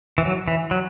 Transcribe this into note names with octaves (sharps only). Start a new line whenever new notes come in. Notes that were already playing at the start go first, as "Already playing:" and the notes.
E3
F#3
E3
F#3